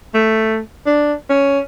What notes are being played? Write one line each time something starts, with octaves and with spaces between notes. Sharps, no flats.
A3
D4
C#4